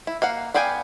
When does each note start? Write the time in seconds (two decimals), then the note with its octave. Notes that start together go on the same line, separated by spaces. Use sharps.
0.07 E4
0.22 A#3 F5 F#5
0.54 B3 D5 F5 G5 G#5